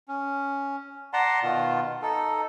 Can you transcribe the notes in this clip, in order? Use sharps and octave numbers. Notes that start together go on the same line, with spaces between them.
C#4
D5 F#5 A5 A#5 C6
B2 D#3 B3 F4
D#4 A4